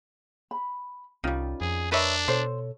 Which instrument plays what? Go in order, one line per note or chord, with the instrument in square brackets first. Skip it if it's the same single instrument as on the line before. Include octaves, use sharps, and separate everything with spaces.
[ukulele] B5
[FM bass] C2 [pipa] D#3 G3 [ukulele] C#4 F4
[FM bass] F2 [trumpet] G#4
[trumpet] D4 [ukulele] A#4 D#5 [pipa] B4 C#5 E5
[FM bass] B2 [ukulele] A4 C#5 [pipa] C5